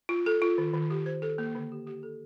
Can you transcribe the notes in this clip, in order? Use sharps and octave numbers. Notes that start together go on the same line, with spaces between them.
F4
A4
F4
D#3
D#3
G4
C5
A4
A#3
D3
G4
G4
A4